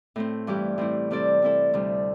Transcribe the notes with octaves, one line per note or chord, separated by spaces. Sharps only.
A2 A3 C4
G2 E3 G3 E4 G4
A2 G3 C4 E4
C3 G3 C4 A4 D5
G3 C4 E4 A4
D2 C3 G3